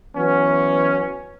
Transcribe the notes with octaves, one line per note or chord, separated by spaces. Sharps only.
E3 F#3 B3 C#4